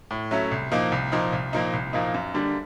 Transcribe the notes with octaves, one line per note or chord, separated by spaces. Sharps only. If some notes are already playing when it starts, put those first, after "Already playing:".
A2
F#3 A3 C#4 E4
C2
A#2 F3 A#3 D#4
C2
A#2 F3 A#3 D#4
C2
A#2 F3 A#3 D#4
C2
A#2 F3 A#3 D#4
F#2
D3 G3 A#3 D4